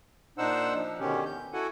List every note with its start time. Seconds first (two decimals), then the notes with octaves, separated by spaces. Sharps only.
0.38 A#2 D4 D#4 C5 F#5 E6
0.74 F3
1.00 B2 D3 D#3 C#4 G4
1.25 G6
1.53 E4 F#4 A4 F#5 G#5